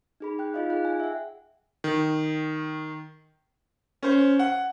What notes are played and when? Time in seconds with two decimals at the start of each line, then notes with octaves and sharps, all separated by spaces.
0.20 D#4 G#4 B5
0.39 G5 F#6
0.54 D#4 F4 D#5 F5
0.70 G#4 G5 F#6
0.85 G#5
1.00 E5 F#5
1.84 D#3
4.03 C#4 C5
4.39 F#5